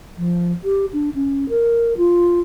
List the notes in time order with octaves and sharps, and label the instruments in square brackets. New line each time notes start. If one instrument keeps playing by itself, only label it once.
[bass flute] F3
G4
D4
C#4
A#4
F4